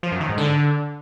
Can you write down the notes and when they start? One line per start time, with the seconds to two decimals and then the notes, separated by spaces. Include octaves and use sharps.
0.03 F3
0.12 F#2
0.20 D#3
0.29 G#2
0.37 D3